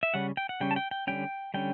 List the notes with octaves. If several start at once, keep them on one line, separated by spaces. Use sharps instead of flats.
E5
C#3 G3 C#4 F#5
G5
F#5
C#3 G3 C#4 G5
A5
G5
G5
D3 G3 C#4 G5
D3 G3 C#4 G5